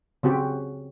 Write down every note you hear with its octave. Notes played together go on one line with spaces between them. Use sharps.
C#3 C4 F#4 G4